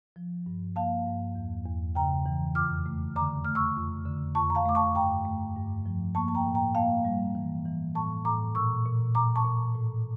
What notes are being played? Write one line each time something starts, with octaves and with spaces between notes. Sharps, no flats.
F3
G2
A#3 F5 A5
G2
E2
E2
C#3 G5 A#5
E3
F2 D6 F6
A3
D3 A#5 D6
A3 F6
C#6 E6
F2
D3
F2 A5 C#6
A#5
F5 A5
A3 D6
A5 C#6
G2 G5 A#5
A3
G2
F3
A#3 A5 C#6
A5
G5 A#5
A2
G5 A#5
A#3 F5 A5
G3
E3
E3
A2 A5 C#6
A2 A#5 D6
A#2 C#6 E6
A#2
A#2 A#5 D6
A5 C#6
A#2
A2